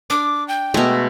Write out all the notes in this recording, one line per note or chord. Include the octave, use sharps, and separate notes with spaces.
D4 D6
G5
B2 G#3 A3 A#5